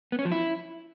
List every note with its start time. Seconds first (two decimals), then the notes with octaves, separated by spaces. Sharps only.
0.12 B3
0.19 C#4
0.25 F3
0.32 E4